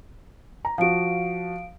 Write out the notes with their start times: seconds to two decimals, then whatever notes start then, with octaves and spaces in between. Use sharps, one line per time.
0.65 A#5
0.78 F3 F#4 F5 D7